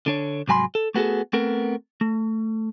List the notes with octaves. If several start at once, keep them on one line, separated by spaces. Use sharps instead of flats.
D3 D4 C#5
C2 G#2 F#3 G#5 B5 C6
A4
A3 B3 F#4 G#4 A4
A3 B3 C4 A4 A#4
A3